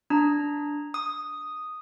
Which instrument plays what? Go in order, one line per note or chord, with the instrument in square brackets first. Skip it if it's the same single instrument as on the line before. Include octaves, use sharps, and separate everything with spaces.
[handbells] D4 A#5
D#6